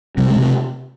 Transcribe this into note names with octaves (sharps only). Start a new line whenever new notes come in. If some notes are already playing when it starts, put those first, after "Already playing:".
C3 G3
G#3
C3
A3